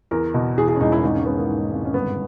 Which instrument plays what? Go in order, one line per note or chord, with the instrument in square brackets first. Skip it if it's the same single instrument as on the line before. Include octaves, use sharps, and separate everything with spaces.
[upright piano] E2 A#4
B2
E2 G#4
G#4
C#4
E1 D#4
E4
G#1 D#4
C#4
G#1 B3
A#3
G#2
G#1
C#4
G1 B3